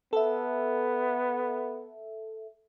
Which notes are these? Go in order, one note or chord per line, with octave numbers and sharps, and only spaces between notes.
B3 A4 E5